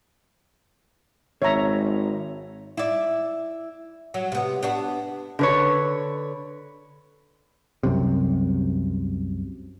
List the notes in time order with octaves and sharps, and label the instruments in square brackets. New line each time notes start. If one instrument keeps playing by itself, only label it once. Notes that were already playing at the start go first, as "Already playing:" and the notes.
[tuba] G#1 [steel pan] C#5 E5 A#5
[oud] E4 D5
F#3
C3 B3
B3 D4 F#4
[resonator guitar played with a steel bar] D3 B4 C#5
[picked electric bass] C2 F#2 C3